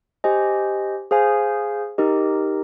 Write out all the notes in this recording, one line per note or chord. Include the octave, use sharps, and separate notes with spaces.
G4 C5 D#5 G#5
G#4 C5 F5 G#5
D#4 G4 A#4 D#5